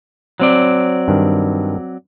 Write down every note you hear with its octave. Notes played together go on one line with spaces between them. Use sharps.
F#3 C4 D5
G2 D#3